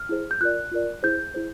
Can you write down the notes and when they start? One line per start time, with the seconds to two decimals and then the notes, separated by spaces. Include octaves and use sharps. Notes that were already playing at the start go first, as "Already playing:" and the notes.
Already playing: F6
0.09 E4 G#4 C5
0.31 G6
0.41 F4 A#4 D5 F#6
0.72 F4 A#4 D5
1.03 E4 G#4 C5 G6
1.34 E4 G#4 C5